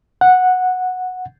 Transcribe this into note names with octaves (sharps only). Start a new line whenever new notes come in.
F#5